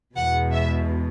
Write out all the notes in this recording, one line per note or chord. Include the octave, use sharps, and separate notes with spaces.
E2 B2 G#3 F#5
E5